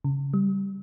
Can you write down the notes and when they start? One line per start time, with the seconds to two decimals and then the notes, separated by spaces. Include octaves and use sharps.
0.04 C#3
0.34 G3